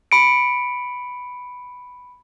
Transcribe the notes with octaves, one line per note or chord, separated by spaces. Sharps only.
B5 C#7 D7